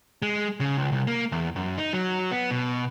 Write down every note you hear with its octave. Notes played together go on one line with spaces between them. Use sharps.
G#3
C#3
C#2
C2
A#3
E2
F#2
D#4
F#3
B3
B2